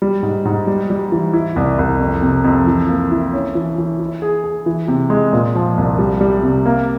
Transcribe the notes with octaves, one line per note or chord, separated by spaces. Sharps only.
G3
G#2
G#2
G3
G3
E3
E4
C2
C2
F2
C3
F2
E3
A#3
E4
C#4
E3
E3
E4
G#4
G#4
E3
C3
G#3
A#2
F3
C2
G3
G3
C3
A#3